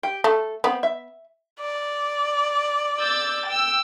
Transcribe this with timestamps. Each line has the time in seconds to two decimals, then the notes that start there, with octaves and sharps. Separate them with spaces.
0.03 G4
0.24 A3 A4
0.64 B3 C4 B5
0.83 E5
1.60 D5
2.98 E6 G6 A6
3.46 G5 E6